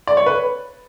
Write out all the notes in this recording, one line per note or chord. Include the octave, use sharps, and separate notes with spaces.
D5
C#5
B4